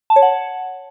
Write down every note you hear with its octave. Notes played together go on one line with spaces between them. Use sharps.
A5
C#5
F#5